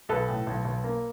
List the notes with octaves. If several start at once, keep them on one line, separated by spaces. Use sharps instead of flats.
B1 A4 B4
A2
B1
B1
A#3